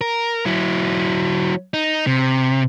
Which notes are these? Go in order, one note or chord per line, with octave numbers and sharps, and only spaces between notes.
A#4
F#3 E4
D#4
C3